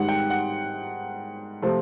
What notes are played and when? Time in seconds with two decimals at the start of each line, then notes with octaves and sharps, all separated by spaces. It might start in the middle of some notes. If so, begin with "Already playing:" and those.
Already playing: G#2 D#3 G3 F#5
0.09 G5
0.30 F#5
1.62 C3 F3 A3